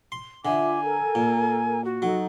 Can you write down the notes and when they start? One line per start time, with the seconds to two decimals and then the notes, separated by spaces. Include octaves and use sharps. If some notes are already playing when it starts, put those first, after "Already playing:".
0.12 C6
0.45 D3 F4 E5 G#5 D6
0.84 A4 A#4 A#5
1.15 A#2
1.85 F#4
2.02 F#3 D#4 A4